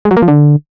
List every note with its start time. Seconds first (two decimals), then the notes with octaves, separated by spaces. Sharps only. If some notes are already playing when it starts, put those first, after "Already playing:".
0.05 G#3
0.11 F#3
0.17 A#3
0.22 F3
0.28 D3